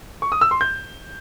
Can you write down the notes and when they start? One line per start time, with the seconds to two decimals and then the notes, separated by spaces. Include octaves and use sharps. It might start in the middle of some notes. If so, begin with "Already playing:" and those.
0.22 C#6
0.32 D#6
0.41 E6
0.51 C6
0.61 G6